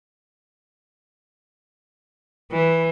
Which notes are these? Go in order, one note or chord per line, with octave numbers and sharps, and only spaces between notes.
E3